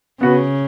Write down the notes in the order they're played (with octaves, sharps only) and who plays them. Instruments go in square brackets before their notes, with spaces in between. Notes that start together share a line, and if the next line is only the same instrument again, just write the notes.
[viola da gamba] C#3 [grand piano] B3 F#4 B4